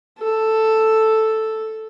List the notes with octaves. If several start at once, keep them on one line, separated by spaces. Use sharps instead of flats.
A4